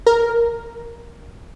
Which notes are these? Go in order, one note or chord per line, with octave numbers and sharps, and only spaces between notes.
A#4